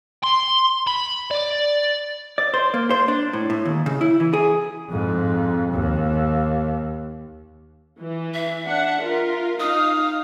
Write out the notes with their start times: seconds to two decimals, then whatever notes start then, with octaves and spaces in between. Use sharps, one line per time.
0.24 C6
0.87 B5
1.31 D5
2.38 D5
2.54 C5
2.74 A#3
2.91 C5
3.08 D4
3.33 A2
3.50 A2
3.65 D#2
3.86 C#3
4.01 E4
4.20 E3
4.33 G#4
4.89 F2 G#2
5.72 D#2
8.00 E3
8.34 E5
8.65 D4 F#5
9.01 F4 A#4
9.60 D#4 F5 D#6